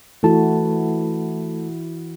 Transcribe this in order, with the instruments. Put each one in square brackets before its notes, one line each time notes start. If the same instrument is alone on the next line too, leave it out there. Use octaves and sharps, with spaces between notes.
[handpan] E3 E4 F#4 [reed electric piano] A3 A4 A5